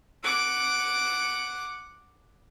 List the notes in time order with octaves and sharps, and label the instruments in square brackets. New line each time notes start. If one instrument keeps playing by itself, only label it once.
[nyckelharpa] F#5 D6